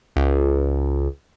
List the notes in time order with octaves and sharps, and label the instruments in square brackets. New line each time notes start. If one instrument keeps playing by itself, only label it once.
[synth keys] C#2